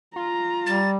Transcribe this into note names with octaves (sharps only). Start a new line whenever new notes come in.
F4 A#5
G3 A6